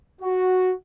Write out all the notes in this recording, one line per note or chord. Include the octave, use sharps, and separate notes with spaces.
F#4